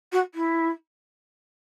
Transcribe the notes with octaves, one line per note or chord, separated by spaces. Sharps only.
F#4
E4